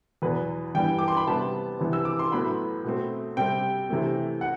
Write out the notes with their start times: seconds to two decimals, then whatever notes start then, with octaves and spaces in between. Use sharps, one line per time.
0.22 E2 B2 F#3 B4
0.75 G2 E3 G3 B3 G5
0.99 D6
1.08 C6
1.17 B5
1.27 C3 G3 B3 A5
1.80 C3 E3 B3
1.93 E6
2.05 D6
2.19 C6
2.31 A2 F#3 B3 B5
2.84 B2 A3 C4
3.37 C3 G3 C4 G5
3.89 C3 E3 A3 C4
4.41 F#5